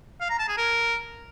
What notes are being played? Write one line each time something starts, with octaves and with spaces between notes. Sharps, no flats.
F5
A#5
A5
G#4
A#4